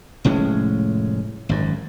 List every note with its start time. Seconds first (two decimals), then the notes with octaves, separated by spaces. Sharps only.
0.25 F1 A2 G#3 C#4
1.49 G#1 F#2